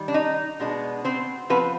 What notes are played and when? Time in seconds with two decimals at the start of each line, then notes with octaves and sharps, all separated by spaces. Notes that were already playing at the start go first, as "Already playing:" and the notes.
Already playing: D#3 G3
0.08 D4
0.14 D#4
0.60 B2 G#3 B3 D4
1.05 C4 C5
1.50 F3 B3 C4 B4